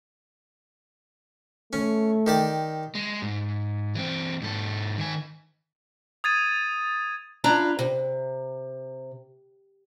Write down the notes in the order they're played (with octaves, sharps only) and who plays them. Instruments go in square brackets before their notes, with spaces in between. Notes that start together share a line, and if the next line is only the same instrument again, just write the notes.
[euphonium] A3 [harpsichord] C#4
[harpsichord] D#3 G4 D5
[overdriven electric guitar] G#3
G#2
E3 C4
G#2 A4
D#3 G#5
[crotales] D#6 G#6 A6 D#7
[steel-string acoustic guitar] D4 E4 F4 A#5
C3